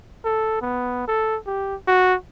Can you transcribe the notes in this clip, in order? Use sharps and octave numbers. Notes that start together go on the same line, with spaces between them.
A4
B3
A4
G4
F#4